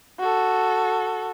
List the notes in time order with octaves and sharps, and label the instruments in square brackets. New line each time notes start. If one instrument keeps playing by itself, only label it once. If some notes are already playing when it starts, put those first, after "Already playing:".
[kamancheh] F#4 A4